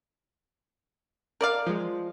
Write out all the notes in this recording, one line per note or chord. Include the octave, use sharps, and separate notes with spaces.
A#4 D5 F5
F3 G#3